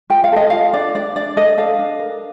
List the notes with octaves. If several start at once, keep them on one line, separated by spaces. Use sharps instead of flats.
F4 G5
F5
A4 D#5
F4 F5
D4 D5
D4 D5
D4 D5
A4 D#5
A4 F5
D4
A#4